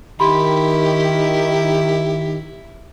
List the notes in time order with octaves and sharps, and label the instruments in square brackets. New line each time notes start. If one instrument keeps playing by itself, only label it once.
[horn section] D#3 [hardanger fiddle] E4 [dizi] G4 [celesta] B5 C6